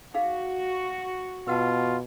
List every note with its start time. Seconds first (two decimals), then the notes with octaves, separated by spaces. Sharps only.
0.14 D#4 F#4 G#4 F5
1.47 B2 F4 B4 F#5 A5